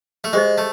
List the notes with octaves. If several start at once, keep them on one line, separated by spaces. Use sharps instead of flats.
A3
G#3 G4 C5 D#5
A3